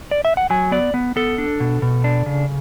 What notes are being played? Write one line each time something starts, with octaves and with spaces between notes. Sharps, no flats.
D5
E5
F#5
F#3 G#5
B3 D5
B3
B3 A4
D4
B2
B2
D4
C#3